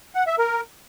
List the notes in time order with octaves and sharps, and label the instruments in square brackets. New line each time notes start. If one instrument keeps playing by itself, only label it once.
[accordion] F#5
E5
A#4